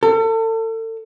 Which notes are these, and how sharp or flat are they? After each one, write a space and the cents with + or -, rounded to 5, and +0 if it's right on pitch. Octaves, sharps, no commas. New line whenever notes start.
A4 +35